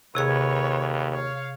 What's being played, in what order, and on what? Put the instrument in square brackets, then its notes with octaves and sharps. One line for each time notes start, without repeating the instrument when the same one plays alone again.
[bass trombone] D#2 [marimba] C3 G#4 G#6 [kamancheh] B4 C#5
[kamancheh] C#5 F5